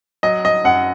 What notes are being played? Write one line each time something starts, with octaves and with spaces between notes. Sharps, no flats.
F#3 D#5
D#5
F#2 F#5